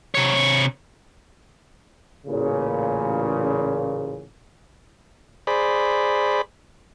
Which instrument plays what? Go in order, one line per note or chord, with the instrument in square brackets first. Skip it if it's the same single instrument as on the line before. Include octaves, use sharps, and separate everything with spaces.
[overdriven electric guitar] C3 C#5
[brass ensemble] A1 A#2 C#3
[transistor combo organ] G#4 C5 D5 B5